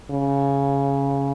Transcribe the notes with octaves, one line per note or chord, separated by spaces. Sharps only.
C#3